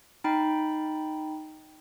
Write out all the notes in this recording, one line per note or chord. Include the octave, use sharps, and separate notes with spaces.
D#4 G5 B5